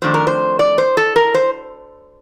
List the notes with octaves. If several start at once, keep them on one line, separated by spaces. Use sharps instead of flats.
F2 D#3 A3 D4 C5
A#4
C5
D5
C5
A4
A#4
C5